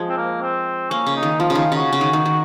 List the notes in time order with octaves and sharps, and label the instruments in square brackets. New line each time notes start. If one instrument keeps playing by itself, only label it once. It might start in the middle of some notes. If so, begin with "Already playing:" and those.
Already playing: [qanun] F3 G#3
[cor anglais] C4
A#3
C4
[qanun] A#3 [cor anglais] C#4
[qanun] C#3
[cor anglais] D#4
[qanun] D#3
[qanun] F3 [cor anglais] F4
[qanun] C#3 [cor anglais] F4
[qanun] D#3
[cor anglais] F4
[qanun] C#3 [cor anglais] F#4
[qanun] C#3
D#3
D#3
D#3